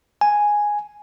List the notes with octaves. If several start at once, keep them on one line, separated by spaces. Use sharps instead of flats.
G#5